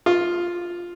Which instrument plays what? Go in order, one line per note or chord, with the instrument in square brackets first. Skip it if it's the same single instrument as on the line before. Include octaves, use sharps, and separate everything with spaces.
[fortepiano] F4